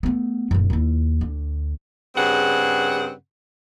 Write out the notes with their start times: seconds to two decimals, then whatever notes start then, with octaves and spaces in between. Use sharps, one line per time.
0.03 A3 B3
0.51 D#1 F#2
0.70 D#2 E4
1.21 D2
2.15 G2 C#3 C4 G#4 F#5